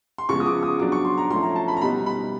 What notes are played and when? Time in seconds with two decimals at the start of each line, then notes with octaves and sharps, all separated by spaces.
0.18 C6
0.29 C#3 F3 G#3 B3 C#6
0.40 D#6
0.46 D6
0.63 D#6
0.79 F#3 B3 D4 D6
0.92 C#6
1.05 C6
1.18 A#5
1.30 F3 A3 C#4 E4 C6
1.43 A#5
1.56 A5
1.68 B5
1.77 A#5
1.81 B2 G3 B3 D#4 B5
2.06 B5